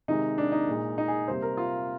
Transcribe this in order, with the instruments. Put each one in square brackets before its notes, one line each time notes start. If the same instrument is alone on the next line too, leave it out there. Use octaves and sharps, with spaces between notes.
[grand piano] C3 D#3 G#3 D#4
D4
D#4
A#2 G#3
D#4
G#4
C3 G3 A#3 C5
A#4
F4